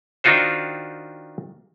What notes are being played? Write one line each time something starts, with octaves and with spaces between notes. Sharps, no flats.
D#3 D4 D#4 F4 F#4 C5